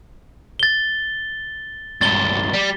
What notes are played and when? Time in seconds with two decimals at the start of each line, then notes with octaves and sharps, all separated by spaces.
0.59 A6 G7
2.01 C#2 G2 A6 G7
2.54 G3